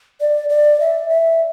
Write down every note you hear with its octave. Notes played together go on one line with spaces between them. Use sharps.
D5
D5
E5
E5